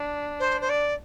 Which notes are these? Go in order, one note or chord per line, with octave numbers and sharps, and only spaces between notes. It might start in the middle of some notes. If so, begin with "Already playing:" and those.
Already playing: D4
C5
C5
D5